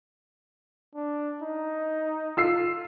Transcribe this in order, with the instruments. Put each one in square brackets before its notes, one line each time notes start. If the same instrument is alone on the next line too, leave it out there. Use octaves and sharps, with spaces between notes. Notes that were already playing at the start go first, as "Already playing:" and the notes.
[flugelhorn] D4
D#4
[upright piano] F4 E6 C7